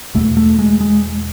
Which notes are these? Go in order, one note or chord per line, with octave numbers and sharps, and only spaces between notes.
E2 B2 A3
A3
G#3
G#3